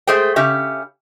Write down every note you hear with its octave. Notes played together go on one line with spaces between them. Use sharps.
G#3 A3 G#4 C5 G5
C#3 C#4 G4 E5